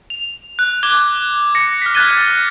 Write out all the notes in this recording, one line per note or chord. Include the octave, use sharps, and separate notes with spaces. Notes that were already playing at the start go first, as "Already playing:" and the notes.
F7
F#6
D6 F#6 G#6 G7
A#6 C#7
F6 B6
F#6 G#6 A6 B6 D#7 G7